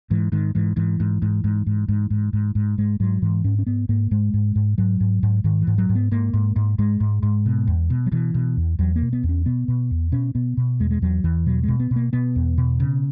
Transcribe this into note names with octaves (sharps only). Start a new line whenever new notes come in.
G#2 E3
G#2 D#3
G#2 E3
G#2 E3
G#2
G#2
G#2
G#2
G#2
G#2
G#2
G#2
G#2 G#3
G#2 F#3
G#2 E3
G#2 C#4
C#4
G#2 B3
G#2 A#3
G#2 G#3
G#2
G#2
G#2 F#3
G#2
G#2
G#2 D#3
E3
G#2
F#3
G#2
B3
G#2 A#3
G#2
G#2
G#2 G#3
G#2
G#2
B2
E2
B2
F#3
B2 E3
B2
E2
E2 F#3
A#3
B2
B3
E2
C#4
B2 B3
B2
E2
B2 C#4
B2 B3
B2
E2 G#3
G#3
E2 F#3
E2 E3
B2 F#3
B2 G#3
B3
B2
A#3
B2 B3
E2
B2
C#3